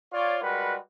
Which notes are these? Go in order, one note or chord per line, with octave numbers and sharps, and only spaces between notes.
F4 C#5 D5
G3 G#3 F#4 A#4 B4 F#5